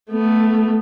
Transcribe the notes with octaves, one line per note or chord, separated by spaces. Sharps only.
A3 B3